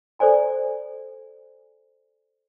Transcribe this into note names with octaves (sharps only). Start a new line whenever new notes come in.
A4 C5 D5 G#5 A#5